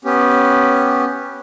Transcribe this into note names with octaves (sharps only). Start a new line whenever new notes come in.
B3 C#4 G4